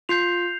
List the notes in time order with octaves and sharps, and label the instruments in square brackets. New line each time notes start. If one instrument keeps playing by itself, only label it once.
[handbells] F4 [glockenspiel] G6 C7 F7